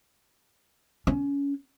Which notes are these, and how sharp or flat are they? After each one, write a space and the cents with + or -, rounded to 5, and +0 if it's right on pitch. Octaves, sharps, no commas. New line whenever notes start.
C#4 +25